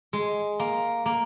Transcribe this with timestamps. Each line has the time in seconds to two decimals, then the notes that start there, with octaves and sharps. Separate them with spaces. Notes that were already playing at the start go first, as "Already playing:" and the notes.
0.13 G#3
0.60 A#3
1.06 A#3